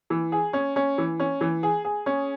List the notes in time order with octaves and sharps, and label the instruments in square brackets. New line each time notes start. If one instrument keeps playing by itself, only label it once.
[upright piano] E3
G#4
C#4
C#4
E3
C#4
E3
G#4
G#4
C#4